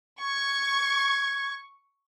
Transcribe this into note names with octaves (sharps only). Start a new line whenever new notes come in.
C#6 G#6